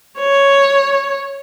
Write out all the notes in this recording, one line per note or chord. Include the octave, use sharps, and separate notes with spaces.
C#5